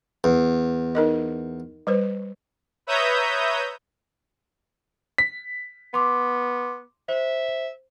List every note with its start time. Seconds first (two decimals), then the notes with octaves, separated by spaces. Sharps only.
0.24 E2
0.95 D#4 A#4 D#5
1.87 G3 B4 C5
2.87 B4 C#5 E5 A#5 D#6 G6
5.18 B6
5.94 B3 C6 D6
7.09 C5 E5